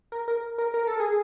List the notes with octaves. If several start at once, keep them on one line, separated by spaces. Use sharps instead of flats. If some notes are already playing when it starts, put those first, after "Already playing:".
A#4
A#4
A#4
A#4
A4
G#4